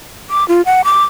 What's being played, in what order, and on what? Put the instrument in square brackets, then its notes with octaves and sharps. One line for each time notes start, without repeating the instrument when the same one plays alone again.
[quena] D6
F4
F#5
D6